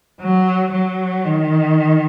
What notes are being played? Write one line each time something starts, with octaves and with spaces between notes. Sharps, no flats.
F#3
F#3
D#3